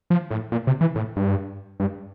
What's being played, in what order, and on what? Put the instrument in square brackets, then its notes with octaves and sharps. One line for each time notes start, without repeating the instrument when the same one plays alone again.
[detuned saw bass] F3
A2
A#2
C3
E3
A2
G2
G2